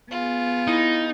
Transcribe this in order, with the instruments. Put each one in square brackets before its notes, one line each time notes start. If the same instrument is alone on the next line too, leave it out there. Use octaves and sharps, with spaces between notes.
[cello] B3 [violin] F4 G#4
[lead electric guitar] D#4 [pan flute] E4